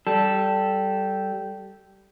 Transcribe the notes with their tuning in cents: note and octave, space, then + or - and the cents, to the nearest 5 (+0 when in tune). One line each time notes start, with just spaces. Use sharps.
G3 -15 A4 +0